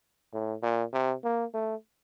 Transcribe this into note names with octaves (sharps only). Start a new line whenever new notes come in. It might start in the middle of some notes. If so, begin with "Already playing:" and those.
A2
A#2
C3
A#3
A3